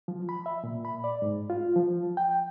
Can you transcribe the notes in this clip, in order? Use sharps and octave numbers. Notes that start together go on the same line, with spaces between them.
F3
B5
E5
A#2
B5
D5
G#2
F4
F3
G5